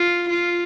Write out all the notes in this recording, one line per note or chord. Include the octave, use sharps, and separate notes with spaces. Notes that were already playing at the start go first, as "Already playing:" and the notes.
Already playing: F4
F4